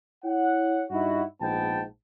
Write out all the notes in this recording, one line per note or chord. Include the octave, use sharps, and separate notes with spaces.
E4 C#5 F#5
G2 D#4 E4 F#4
A#1 G#2 B3 G5 A5